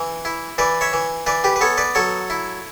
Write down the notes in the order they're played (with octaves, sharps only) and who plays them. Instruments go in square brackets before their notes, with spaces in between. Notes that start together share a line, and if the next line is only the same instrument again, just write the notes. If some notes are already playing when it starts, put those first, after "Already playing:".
Already playing: [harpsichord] E3
E4
E3 B4 D5
C#5 E5
E3
E3 B4 D5
G4 B4
B4
B3 A4 C#5
B4 D5
F#3 A4 C#5
E4